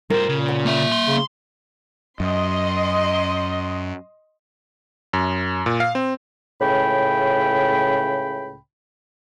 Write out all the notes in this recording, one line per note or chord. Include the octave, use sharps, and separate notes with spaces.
G2 F4 G4 A#4 C5
A#2 C#3
F#5
A#3 E5
C6
C#3
F#2 D#5 C6
F#2
A#2
F5
C4
C#2 A2 C#3 G5 B5